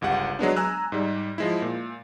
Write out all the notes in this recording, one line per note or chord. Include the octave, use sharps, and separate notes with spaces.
G1 C#2 G4 F#5
F#3 G#3 B3 D4
G#5 A#5 E6 F#6
G#2 G3
F3 G#3 E4
A#2